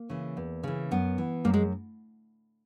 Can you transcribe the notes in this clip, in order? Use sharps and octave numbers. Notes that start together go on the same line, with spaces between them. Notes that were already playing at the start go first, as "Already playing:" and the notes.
Already playing: A#3
C#3 E3
E2
C#3 E3
F#2 B3
E3
F#2 A#3
G#3